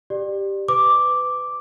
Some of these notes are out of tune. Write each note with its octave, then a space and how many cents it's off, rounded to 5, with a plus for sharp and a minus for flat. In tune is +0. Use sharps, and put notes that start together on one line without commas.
G4 +0 D5 +20
B4 +30 D6 +0